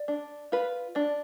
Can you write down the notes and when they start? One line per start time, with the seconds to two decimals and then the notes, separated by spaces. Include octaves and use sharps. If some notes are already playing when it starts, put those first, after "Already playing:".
Already playing: D5
0.08 D4
0.52 F4 B4
0.95 D4 D5